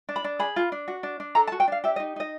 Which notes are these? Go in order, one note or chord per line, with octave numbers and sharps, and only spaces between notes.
D4
B5
D4
G#4 B5
F4
D4
F#4
D4
D4
A4 A#5
A5
F#4
G5
D4 F5
G4 E5
D#5
D#4
D#4 D#5